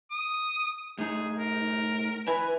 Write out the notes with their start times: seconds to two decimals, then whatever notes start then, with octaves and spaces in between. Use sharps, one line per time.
0.11 D#6
0.98 A2 D#4 G#4
1.39 A#4
2.27 E4 B4 E5 G#5